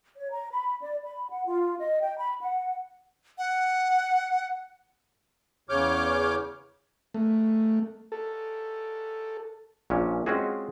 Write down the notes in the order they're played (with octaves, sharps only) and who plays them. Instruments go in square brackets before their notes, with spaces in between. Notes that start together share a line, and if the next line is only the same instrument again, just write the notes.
[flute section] C#5
A#5
B5
D5
B5
F#5
F4
D#5
G5
B5
F#5
[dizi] F#5
[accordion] E2 C#3 C#5 D6 F6 G6
[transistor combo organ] A3
A4
[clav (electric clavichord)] A#1 A#2 C#4
G#3 C4 C#4 F4 F#4 G#4